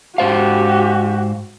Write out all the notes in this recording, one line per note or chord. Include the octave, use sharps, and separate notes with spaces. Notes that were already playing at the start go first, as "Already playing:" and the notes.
G#2 F#4 G4 C5 F5